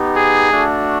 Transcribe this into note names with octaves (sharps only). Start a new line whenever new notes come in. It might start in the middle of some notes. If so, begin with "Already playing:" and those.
Already playing: B3 D#4 G4
G#4
A3 D4 F#4